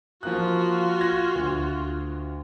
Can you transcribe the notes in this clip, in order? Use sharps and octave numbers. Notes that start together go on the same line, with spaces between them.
F3 A#3 F4 F#4 F#6
F#6 G#6 A#6
D2